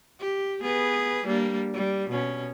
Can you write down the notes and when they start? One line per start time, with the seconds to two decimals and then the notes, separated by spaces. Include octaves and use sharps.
0.20 G4
0.61 B3 G#4 B4
1.25 G3 A#3 D4
1.74 G3
2.10 B2 C#4